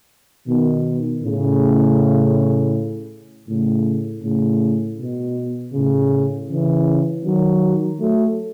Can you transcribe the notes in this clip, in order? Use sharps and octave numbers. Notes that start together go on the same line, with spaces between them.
B2 D#3
A2 C#3
A2 C#3
A2 C#3
B2
A2 C#3
C#3 E3
D#3 F#3
F#3 A3